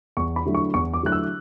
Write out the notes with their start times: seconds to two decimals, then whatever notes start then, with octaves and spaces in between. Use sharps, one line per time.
0.17 E2 C#6
0.36 B5
0.45 D3 F#3 A3 E4
0.55 C#6
0.74 E2 C#6
0.94 D6
1.03 D3 F#3 A3 E4 F#6
1.12 E6